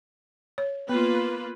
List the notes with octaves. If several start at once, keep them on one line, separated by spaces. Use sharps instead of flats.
C#5
A#3 B3 F4 B4